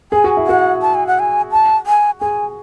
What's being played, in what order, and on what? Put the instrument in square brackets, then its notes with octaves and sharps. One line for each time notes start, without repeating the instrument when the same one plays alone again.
[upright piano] G#4 [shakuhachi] G#5
[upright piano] F#4
E4
[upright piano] F#4 [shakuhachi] F#5
[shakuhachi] A5
G#5
F#5
G#5
A5
G#5
[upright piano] G#4 [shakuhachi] G#5